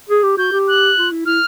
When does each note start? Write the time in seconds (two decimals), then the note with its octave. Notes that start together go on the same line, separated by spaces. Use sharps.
0.09 G#4
0.23 G4
0.38 F#4 G6
0.53 G4
0.68 F#6
0.97 F4
1.11 E4
1.26 E4 F6